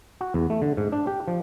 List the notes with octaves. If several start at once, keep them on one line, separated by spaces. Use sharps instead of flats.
F#4
E2
A3
D3
G#2
D4
G4
F3